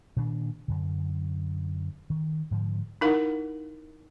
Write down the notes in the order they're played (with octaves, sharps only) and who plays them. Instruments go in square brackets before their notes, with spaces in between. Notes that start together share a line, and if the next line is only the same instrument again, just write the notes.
[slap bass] A#2 D#3 D4
F#2 D3
D#3
G#2 D3 F3
[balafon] D#4 E4 A#4 F5 F#5